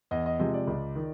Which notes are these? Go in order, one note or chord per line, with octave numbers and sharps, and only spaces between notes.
E2 D#5
D#5
C3 F3 G#3 D#5
D5
C#2
D#3